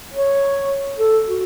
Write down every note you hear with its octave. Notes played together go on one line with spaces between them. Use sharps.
C#5
A4
F#4